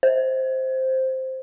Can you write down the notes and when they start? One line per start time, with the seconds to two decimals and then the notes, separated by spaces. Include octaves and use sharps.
0.03 C5